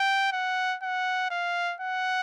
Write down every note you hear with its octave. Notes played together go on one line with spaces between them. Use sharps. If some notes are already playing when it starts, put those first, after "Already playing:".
Already playing: G5
F#5
F#5
F5
F#5